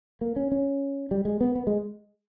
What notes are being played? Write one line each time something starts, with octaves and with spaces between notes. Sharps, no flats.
A#3
C#4
C#4
G3
G#3
B3
B3
G#3